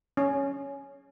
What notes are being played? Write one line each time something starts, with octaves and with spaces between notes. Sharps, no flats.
C#4